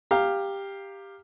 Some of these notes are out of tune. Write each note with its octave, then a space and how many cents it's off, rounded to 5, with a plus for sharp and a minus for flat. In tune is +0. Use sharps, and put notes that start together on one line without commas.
G4 +10 F5 +0 A#5 +0